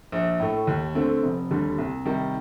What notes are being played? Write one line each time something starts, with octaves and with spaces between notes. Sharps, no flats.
A#1
A2 A3
D#2
D3 A3 C4
F1
D#2 D3 G3
C2
C3 D#3 G3